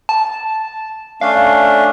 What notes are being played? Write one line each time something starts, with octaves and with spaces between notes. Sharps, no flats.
A5
A3 C#4 D4 F5